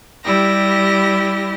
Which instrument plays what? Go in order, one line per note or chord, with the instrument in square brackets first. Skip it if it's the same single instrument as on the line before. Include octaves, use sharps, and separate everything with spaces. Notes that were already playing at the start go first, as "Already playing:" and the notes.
[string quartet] G3 E4 G4 A#6